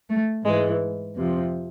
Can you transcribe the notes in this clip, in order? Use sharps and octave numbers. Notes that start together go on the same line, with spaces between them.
A3
G#2 E3 G#3
F2 C3 F3